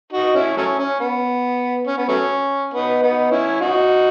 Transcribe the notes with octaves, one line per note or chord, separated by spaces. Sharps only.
D#4 F#4
C#4 E4
F#3 A3 C#4
C#4
B3
C#4
B3
F#3 A3 C#4
B3 D#4
B3 D#4
C#4 E4
D#4 F#4